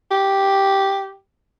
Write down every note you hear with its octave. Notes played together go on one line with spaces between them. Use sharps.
G4